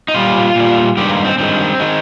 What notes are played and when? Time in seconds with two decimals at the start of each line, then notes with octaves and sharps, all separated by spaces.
0.08 D#4
0.14 A#2 G3 F4
0.56 A#2 G3
0.97 G2 D#3 G#3 G4
1.11 A#3
1.25 C4
1.38 G2 D#3 G#3 C4
1.80 D#3 G#3